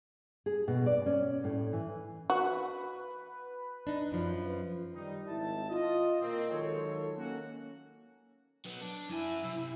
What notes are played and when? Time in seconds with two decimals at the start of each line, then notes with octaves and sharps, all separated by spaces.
0.46 G#4
0.68 B2
0.86 D5
1.06 C#4
1.44 A2
1.73 E3
2.30 F#4 B4
3.87 D4 D#4
4.12 F#2 F3
4.94 D#3 G3 D#4
5.28 G#1 D#3 E4 A5
5.69 F4 D#5
6.21 A#2 A#3 C4
6.51 D#3 F#3 G#3 F4 A4 C#5
7.18 A#3 C#4 F#4
8.65 F#3 B3
8.82 D4
9.10 F#2 E4 G#5
9.44 C3